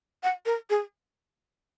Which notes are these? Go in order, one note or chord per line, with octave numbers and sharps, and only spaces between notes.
F#5
A#4
G#4